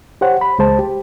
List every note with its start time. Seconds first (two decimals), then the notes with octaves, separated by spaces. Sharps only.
0.21 G4 C5 C#5 F#5
0.41 B5
0.58 C#2 G#3 C5 A5
0.79 G4